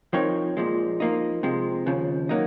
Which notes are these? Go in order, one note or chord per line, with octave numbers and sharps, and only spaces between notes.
F3 C4 D#4 A#4 C#5
A#2 F3 G#3
F3 A#3 D#4
C3 F3 G#3
D#2 C#3 F3
F#3 A#3 D#4